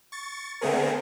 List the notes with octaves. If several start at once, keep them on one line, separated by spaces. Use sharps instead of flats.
C#6 A6
D3 A3 B3 C4 G#4 A#4